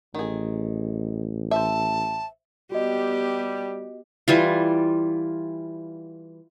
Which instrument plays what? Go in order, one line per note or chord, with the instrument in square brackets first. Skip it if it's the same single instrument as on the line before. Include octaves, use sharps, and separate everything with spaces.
[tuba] A1 [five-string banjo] D#3 G#4
[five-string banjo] C5 E5 [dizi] A5
[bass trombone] G3 [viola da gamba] B3 G4 [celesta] F#4 D#5
[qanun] E3 G3 F4